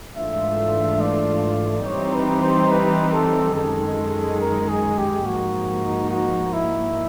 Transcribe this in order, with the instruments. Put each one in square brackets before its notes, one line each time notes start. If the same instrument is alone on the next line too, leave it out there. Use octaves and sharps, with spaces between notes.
[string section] G#2 E3 A3 D4 F4 [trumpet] E5
[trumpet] D5
[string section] E3 G3 C4 D#4 G4 [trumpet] C#5
[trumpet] B4
C5
B4
A4
[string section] F#2 D#3 G#3 [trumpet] A4
[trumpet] A#4
G#4
G4
[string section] G#2 F3 A#3 D#4 [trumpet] F#4
[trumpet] F#4
E4